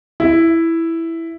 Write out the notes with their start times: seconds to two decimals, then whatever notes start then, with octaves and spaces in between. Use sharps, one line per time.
0.20 E4